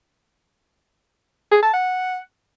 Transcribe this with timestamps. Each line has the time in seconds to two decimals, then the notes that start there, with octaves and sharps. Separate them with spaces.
1.51 G#4
1.62 A5
1.74 F#5